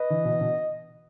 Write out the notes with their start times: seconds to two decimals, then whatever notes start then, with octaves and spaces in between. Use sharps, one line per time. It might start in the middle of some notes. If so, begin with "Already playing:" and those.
Already playing: B4 D#5
0.10 E3
0.25 B2
0.41 B2